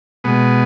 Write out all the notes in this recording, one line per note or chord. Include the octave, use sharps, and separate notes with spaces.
B2 G#3 B3